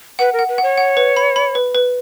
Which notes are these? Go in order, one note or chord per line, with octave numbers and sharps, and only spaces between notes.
B4 F#5
A#4
F#5
B4
C#5 F#5
F#5
B4
B5
B5
B4
B4